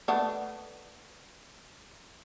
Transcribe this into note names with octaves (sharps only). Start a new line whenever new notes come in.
A3 B3 D4